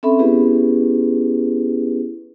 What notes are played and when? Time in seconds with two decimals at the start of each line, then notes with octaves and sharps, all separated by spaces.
0.03 C4 C#4 A4 E5 B5
0.19 B3 C#4 E4 G4 G#4 B4